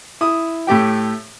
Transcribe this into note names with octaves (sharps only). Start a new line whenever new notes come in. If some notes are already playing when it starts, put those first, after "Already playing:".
E4 D#6
A2 A3 G4 G5